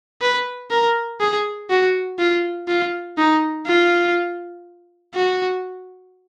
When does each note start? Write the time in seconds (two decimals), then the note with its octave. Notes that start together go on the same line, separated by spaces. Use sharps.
0.21 B4
0.70 A#4
1.21 G#4
1.70 F#4
2.19 F4
2.68 F4
3.18 D#4
3.66 F4
5.15 F#4